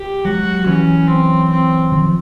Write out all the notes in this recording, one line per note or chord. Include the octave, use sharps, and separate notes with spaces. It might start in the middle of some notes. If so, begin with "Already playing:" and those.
Already playing: G4
F#3 G#3 F#4
E3 F#3 C#4
C4
C4
D#3 F3